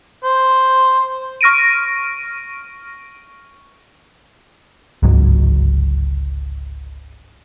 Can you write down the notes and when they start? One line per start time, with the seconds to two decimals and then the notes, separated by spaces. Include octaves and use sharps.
0.24 C5
1.41 C#6 F6 A#6 D7 D#7
5.03 G1 C#2 G#2 F#3